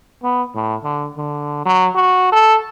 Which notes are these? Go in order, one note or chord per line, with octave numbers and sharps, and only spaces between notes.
B3
A2
D3
D3
F#3
F#4
A4